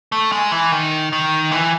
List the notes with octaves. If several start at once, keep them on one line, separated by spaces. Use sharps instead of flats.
A3
G#3
E3
D#3
D#3
E3